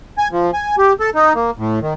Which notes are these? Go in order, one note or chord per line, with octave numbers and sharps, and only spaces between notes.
G#5
F3
G#5
G4
A4
D#4
A#3
A2
D#3